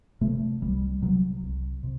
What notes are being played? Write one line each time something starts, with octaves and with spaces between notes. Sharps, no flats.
C3 A3
C2 G3
C3 F#3
C2
C3